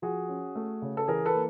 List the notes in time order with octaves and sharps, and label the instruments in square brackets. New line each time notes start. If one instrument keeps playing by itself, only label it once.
[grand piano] F3 F#4 G#4
C#4
A3
C#3
A4
E3 G#4 A#4
A4 B4
A#3